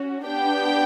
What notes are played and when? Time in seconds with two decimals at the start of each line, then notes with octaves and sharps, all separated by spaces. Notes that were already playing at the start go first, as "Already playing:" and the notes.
Already playing: C#4 F#4
0.26 B3 D4 G4 G5